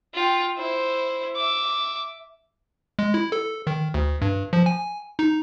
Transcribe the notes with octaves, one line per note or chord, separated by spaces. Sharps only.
F4 G5
E4 C5
E5 D6
G#3
E4
A4
D#3
D2
G2
F3
G#5
D#4